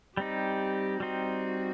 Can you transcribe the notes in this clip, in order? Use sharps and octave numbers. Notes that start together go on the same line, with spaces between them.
G3 C4 D#4 G4
G3 C4 D#4 F#4